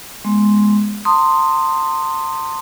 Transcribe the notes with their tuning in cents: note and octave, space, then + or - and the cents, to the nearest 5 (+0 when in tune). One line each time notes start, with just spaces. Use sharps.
G#3 +0 B3 -15 C6 +0
A5 +45 C6 +0 D#6 -10